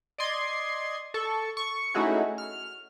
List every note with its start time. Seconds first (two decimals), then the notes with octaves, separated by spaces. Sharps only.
0.18 D5 D#5 C6 G#6
1.14 A4 C#6
1.57 C#6
1.94 A3 C#4 D#4 E4 F#4 G#4
2.38 F6